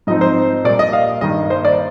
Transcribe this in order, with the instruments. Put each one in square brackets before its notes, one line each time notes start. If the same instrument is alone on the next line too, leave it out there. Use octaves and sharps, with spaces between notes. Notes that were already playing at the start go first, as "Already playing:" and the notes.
[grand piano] G#2 F3 C4 D#4 D#5
C5
A#2 G3 A#3 D5
D#5
F5
G2 D#3 A#3 D#5
C5
D5